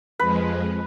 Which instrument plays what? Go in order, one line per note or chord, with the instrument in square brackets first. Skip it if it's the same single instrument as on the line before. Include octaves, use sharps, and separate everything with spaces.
[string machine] F2 F3 G#3 [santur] B4